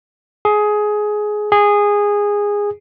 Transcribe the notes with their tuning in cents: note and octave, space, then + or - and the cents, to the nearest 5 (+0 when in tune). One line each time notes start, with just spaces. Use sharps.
G#4 +15
G#4 -15